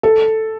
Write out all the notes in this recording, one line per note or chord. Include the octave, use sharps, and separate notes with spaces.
A4